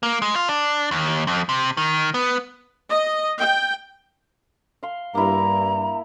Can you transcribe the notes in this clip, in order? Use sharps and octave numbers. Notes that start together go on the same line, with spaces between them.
A#3
G#3
F4
D4
D#2
F2
C3
D#3
B3
D#5
G5
F5 C6
G2 A#3 E4 A#5